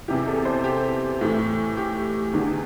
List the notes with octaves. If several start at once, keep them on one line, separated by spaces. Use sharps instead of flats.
E2 C3 E3 G4
A4
C5
G4
A2 E3
G4
E2 D3